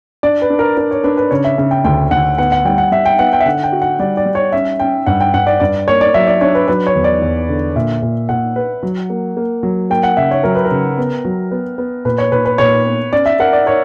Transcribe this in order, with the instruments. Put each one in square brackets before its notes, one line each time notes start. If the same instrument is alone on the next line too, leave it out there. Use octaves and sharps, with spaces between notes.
[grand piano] D4 [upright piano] D5
[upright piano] B4
[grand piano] D4
[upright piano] A#4
[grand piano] D4 [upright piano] A#4
[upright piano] C#5
[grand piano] D4 [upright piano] B4
[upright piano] B4
[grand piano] C#3 [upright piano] C#5
[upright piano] E5
[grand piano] C#3 [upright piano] E5
[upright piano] G5
[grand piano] D2 [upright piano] G5
[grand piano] D2 [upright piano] F#5
[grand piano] B3 [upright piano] F#5
[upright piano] F#5
[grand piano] G3 [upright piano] G5
[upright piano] F#5
[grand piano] G3 [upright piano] E5
[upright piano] G5
[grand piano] B3 [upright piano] F#5
[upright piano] G5
E5
[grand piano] D3 [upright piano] F#5
[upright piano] G5
[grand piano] F#4
[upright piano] F#5
[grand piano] G3 [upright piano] D5
[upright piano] D5
[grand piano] G3
[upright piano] C#5
[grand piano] C#4 [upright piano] E5
[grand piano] C#4 [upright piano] G5
[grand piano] G2 [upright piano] F#5
[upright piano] G5
[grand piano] G2 [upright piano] F#5
[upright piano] D5
[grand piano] G2 [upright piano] D5
[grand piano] A#3 [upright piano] C#5
[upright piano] D5
[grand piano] F#3 [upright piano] E5
[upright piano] D5
[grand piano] D4 [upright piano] C#5
[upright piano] B4
[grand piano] F#3 [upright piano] B4
[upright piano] C#5
[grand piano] E2
[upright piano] D5
[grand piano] E2
D3
[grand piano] A#2 [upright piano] E5
[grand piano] A#2
[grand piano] A#2 [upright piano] F#5
[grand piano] B4
F#3
A#3
A#3
F#3
[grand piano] A#3 [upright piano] G5
[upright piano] F#5
[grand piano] C#3 [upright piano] E5
[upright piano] C#5
[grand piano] F#3 [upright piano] A#4
[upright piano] B4
A#4
[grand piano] C#3
B3
F#3
B3
B3
[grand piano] A#2 [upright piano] B4
[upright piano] C#5
[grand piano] A#2 [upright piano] B4
[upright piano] B4
[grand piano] A#2 [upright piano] C#5
[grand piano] B3
[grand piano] C#4 [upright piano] D5
[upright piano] E5
[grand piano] A#4 [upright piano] F#5
[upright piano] D5
[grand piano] A#4 [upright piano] C#5